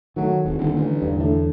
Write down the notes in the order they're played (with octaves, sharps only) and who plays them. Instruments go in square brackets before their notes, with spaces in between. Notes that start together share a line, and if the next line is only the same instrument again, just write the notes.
[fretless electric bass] D#3 A3 [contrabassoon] F#3
[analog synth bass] D#1 [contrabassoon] G#1
[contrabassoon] D#1 [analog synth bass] D3
[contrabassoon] A1
[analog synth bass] E2 [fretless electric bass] G2
[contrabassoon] A2 [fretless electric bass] D3 A3